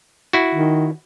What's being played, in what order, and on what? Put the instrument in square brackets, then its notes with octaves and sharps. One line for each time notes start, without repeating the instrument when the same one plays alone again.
[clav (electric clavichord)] E4 F#4
[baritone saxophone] D#3